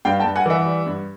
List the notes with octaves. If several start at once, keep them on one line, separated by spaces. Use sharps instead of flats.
G2 F5 G5
G5 A5
G2
F#5 G#5
E3 E5 F#5
G3
G2